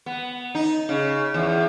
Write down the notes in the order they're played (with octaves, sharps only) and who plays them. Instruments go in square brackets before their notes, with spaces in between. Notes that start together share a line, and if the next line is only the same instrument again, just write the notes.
[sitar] B3
D#4
C#3
E2